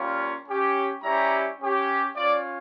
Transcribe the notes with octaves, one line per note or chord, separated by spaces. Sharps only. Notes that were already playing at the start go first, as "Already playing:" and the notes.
Already playing: G3 A#3 C#4 F4
C#4 G4
G3 C#4 E4 G4 A#5
C#4 G4
C#4 F4 D5